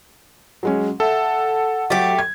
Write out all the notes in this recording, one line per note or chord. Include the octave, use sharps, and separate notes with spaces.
F#3 G#3 C#4
A4 E5 F#5
F#3 A3 G4
G#6